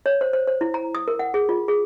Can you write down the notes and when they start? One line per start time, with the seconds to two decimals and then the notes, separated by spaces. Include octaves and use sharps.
0.06 C#5
0.21 C5
0.33 C5
0.47 C5
0.61 E4
0.74 A#5
0.95 D#6
1.08 A#4
1.19 F#5
1.34 G#4
1.49 F4
1.68 G#4